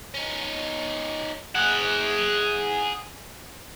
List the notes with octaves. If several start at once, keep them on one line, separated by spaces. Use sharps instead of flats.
C#4 D#4
G#4 F#5